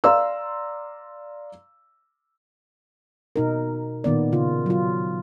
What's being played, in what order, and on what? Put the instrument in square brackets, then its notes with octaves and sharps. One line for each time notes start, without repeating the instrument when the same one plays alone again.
[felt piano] D5 F5 A#5 C6 E6
[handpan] B2 D#4 A#4
A#2 D#3 B3 D5
C#3 F4
F#3 F4